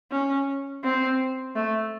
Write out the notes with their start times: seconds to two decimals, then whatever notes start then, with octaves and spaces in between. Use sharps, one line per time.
0.12 C#4
0.84 C4
1.56 A3